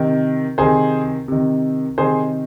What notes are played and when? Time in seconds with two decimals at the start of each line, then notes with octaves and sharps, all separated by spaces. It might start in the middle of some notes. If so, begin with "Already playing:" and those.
Already playing: C3 D#3
0.58 C3 D#3 G#4 C5
1.28 C3 D#3
1.98 C3 D#3 G#4 C5